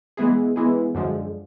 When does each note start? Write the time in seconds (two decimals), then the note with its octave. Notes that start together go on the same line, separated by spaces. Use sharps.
0.17 E3 G#3 B3 E4 G#4
0.56 E3 G#3 B3 E4 G#4
0.95 F#2 D3 F3 G#3